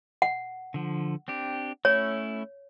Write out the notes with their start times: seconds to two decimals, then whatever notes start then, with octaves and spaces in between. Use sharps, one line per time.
0.22 F#5
0.74 D3 F3
1.28 C4 D4 G4
1.85 A3 C#4 E4 C#5